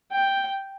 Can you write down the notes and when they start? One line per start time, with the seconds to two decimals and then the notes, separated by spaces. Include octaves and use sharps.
0.12 G5